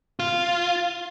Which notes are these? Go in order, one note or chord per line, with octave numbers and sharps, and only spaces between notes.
F4